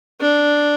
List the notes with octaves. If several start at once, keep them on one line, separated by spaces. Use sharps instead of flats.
D4